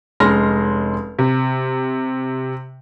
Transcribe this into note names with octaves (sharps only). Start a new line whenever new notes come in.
F1 G#3 C#4 C6 F6 A#6
C3